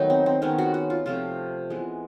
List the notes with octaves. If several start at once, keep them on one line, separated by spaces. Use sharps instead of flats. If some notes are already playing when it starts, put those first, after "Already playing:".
Already playing: D#3 F#3 A3 B3 D#4
C4
C4
D#3 G#3 B3 C#4
F#4
F#4
F4
C3 F3 A3 F4
E3 G#3 B3